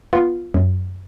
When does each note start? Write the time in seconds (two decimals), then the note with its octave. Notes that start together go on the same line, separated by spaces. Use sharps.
0.13 B3 F4
0.54 F#2